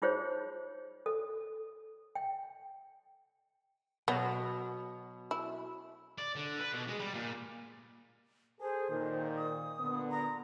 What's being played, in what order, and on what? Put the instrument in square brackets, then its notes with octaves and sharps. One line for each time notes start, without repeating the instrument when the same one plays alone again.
[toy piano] D#4 F4 G#4 C5 C#5
A4
G5
[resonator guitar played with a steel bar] B2 F#3 [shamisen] B3
[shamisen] E4
[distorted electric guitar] D5
D3
B4
B2
G#3
G3
A#2
[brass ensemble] G#4 A4 [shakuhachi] C5
[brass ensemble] A#2 D#3
[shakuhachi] D#6
[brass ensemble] A#2 D3 B3
[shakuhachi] A#5